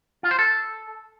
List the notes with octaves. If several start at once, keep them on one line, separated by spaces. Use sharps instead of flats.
F4
C5
A4